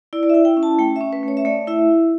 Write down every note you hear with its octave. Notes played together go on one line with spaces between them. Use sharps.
E4 D5
D5
E4 E5
G5
C#4
A5
A3 G5
E5
C#4
B4
A3 C#5
E5
A3 D5
E4 E5